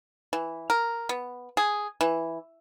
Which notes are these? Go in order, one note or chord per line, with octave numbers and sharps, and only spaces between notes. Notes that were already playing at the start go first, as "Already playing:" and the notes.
E3
A#4
B3
G#4
E3